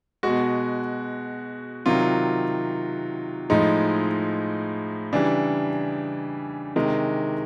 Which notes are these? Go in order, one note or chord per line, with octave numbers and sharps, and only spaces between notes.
B2 G#3 F#4
C3 D#3 F#3 F4
A2 F3 G#3 D#4
C#3 E3 G3 D4
C3 D#3 G#3